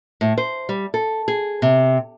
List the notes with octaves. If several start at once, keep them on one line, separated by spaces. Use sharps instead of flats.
A2
C5
G3
A4
G#4
C3